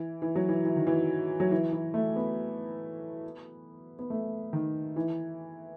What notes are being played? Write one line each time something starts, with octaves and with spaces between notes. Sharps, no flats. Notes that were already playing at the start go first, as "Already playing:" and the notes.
Already playing: E3
E3
F#3
E3
E3
D#3
E3
F#3
E3
E3
A3
B3
B3
A3
D#3
E3